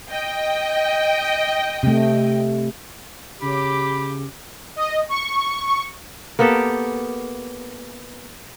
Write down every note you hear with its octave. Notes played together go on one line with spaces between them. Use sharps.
D#5 G5
C3 A3
C#3 G4 B5 D6
D#5
C#6
A#3 B3 G4 A4